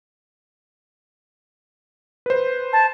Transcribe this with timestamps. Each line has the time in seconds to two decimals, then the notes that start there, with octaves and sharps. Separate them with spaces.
2.26 B4 C5
2.73 A5